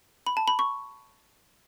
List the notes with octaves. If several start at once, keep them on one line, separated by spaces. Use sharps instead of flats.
B5
A5
B5
C#6